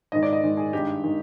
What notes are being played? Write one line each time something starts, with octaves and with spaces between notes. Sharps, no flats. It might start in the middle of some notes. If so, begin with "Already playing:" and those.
G#2 D#3 G#3 D#5
D5
D#5
G#2 D#3 G#3
G#4
G2 D#3 G#3 G4
D#3 G#3